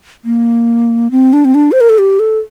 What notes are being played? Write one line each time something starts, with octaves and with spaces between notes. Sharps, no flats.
A#3
C4
D4
C4
D4
C5
A#4
A4
G4
A4